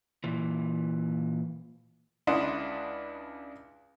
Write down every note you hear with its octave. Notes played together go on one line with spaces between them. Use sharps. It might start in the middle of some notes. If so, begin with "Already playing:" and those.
A#2 E3
C#2 D4 E4 F#5 C6 D#6